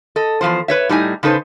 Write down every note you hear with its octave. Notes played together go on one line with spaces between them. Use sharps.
A4 D#5
E2 B2 F3 C5
B4 C#5 E5
A2 G3 D#4 G#5
C#3 D#4 A4 B4 C5